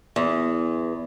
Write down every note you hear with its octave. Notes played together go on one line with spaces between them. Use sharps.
E2